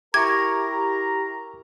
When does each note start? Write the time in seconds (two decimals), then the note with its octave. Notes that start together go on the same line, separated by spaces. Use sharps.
0.14 E4 G4 A#4 A#5 C#6 D6 G#6